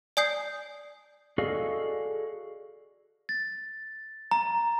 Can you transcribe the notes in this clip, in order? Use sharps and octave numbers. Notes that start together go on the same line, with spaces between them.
D5 G#5 D#6 G6 C7
F#4 G#4 A4 D5 D#5 F5
A6
A#5